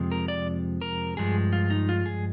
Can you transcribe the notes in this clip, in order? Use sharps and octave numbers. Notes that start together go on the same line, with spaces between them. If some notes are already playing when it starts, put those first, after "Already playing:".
Already playing: F2 C3 F3 G#3
A#4
D5
A#4
G2 F3 G#3 G#4
F4
D#4
F4
G#4